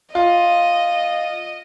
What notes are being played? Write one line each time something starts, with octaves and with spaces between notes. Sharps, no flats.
F4 D#5